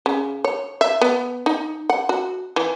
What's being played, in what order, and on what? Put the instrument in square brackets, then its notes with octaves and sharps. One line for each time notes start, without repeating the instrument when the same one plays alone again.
[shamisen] C#3
C#5
E5
B3
D#4
F#5
F#4
E3